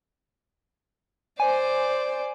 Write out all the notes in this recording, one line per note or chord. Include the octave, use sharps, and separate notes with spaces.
C5 D5 G#5